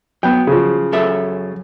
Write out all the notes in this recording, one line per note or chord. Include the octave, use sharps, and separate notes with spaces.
F#3 B3 G5
C#3 F3
F#2 A4 E5